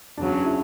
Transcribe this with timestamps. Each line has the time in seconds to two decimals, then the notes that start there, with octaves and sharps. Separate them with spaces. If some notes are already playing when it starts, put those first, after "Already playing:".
0.17 E2 C#3 F#3 C#4 D4
0.46 E4